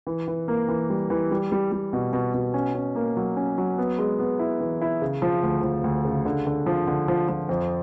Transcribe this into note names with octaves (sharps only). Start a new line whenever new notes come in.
E3
E3
A#3
E3
G3
E3
G3
G3
G3
B2
B2
B2
C#4
C#4
A#3
F#3
C#4
F#3
B3
G#3
B3
E4
E3
E4
C#3
F3
D2
F3
D2
C#3
D3
D3
F3
D3
F3
F3
F2